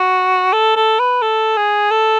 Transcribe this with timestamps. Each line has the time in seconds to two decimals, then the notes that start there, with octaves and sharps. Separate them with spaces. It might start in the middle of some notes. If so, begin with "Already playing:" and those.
Already playing: F#4
0.53 A4
0.76 A4
0.99 B4
1.22 A4
1.57 G#4
1.91 A4